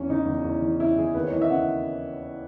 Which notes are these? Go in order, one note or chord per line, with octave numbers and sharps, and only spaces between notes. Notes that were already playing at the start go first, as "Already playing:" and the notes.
Already playing: E2 E3 C#4
C#3 D#4
E2
E2
E3
C#3 E4
E2 G#4
D#2 B4
C#5
E3 D#5
E5
C#3 F#5